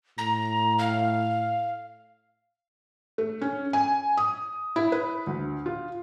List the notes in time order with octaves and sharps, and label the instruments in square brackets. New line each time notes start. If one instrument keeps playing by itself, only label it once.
[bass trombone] A2 [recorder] A#5
[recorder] F5
[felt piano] A3
C#4
G#5
D#6
E4
B4
D2
F4